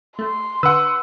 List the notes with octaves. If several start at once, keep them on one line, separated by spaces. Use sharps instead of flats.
A3 C6
D3 B4 F#5 E6